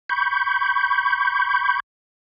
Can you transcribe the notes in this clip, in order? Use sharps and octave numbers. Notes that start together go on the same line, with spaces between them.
B5 C#6 G6